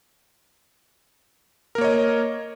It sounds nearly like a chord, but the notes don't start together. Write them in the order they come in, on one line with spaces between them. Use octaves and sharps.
A#4 A#3 C#5 D#5